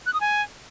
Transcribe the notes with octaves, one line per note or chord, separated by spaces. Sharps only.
F#6
D#6
G#5